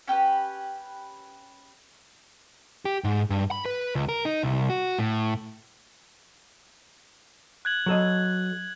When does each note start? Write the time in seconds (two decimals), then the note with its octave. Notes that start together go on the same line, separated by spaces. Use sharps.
0.08 C#4 G4 A#4 B4
2.85 G4
3.04 G#2
3.30 G2
3.51 B5
3.65 B4
3.95 C#2
4.09 A#4
4.25 D#4
4.43 C2
4.70 F#4
4.99 A2
7.65 F#6 G#6 F#7
7.86 F#3 A4 D#5